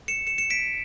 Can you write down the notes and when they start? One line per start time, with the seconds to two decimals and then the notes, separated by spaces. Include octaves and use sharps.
0.08 C#7 E7
0.27 C#7 E7
0.38 C#7 E7
0.50 B6 D7